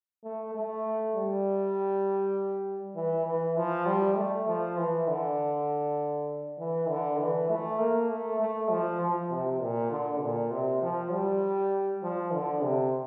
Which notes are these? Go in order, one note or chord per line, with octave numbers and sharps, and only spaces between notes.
A3
A3
G3
E3
E3
F3
G3
A3
F3
E3
D3
E3
D3
E3
A3
A#3
A3
A3
F3
F3
C3
A#2
D3
A#2
C3
F3
G3
F3
D3
C3